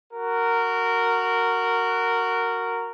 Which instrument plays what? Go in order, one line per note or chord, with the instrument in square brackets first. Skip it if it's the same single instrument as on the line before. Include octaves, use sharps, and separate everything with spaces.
[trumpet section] F#4 A#4